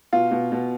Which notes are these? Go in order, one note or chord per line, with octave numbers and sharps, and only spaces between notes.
B2 F4
B2
B2